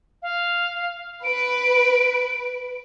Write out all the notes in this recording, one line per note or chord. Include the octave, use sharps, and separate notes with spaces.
F5
B4 D7